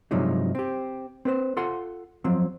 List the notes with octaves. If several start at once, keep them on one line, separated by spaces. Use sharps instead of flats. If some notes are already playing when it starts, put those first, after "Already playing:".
G2 C3 F3 F#3 G#3 D#4
C4 G4
C4 B4 C5
F4 A4 F#5 C6
F3 F#3 C4